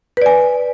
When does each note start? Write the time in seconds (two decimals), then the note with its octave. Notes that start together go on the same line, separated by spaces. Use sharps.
0.17 B4
0.22 D5
0.26 G#5